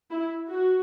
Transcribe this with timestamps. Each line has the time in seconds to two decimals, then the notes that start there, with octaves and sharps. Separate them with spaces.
0.10 E4
0.50 F#4